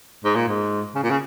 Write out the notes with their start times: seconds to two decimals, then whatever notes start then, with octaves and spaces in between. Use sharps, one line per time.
0.25 G#2
0.36 A#2
0.48 G#2
0.95 C#3
1.03 A#2
1.11 C#3